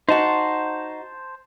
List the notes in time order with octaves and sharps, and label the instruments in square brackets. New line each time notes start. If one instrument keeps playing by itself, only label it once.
[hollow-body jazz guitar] D#4 F#4 [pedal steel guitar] C5 A5